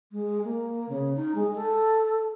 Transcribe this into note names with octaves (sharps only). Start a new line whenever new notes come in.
G#3
A#3
C#3
D#4
G#3
A4